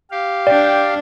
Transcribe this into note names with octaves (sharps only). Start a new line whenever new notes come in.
G4 F5
D4 D5 G5